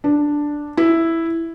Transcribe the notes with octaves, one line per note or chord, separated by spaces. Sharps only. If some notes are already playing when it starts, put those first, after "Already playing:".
D4
E4